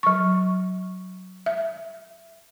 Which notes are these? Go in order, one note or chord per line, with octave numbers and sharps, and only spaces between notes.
F#3 C#6
E5